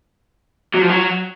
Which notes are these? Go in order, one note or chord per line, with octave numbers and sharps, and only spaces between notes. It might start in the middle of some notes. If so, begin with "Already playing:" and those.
F#3
F3
F#3